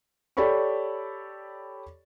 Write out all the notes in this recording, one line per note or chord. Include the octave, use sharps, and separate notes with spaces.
G4 A4 C#5 D5 B5 C#6